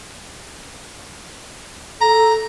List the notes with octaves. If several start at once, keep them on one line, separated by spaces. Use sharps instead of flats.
A4 A#5